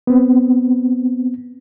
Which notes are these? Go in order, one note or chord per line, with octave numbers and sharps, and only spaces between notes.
B3 C4